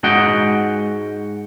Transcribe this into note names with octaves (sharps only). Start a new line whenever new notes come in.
G#2 G#3 F#4 D#5 F#5 G5